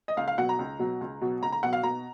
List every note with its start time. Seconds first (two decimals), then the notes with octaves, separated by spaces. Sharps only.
0.08 D#5
0.17 C#2 F5
0.28 F5
0.38 B2 F#3 F#5
0.49 A#5
0.59 C#2
0.79 B2 F#3
1.01 C#2
1.21 B2 F#3
1.42 C#2 A#5
1.52 A#5
1.63 B2 F#3 F#5
1.73 F5
1.83 B2 A#5